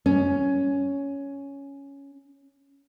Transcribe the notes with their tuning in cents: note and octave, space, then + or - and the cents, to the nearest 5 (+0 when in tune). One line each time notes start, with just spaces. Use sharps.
C#4 +5